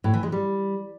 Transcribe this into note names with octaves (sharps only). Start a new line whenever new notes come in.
A2
E3
G#3
G3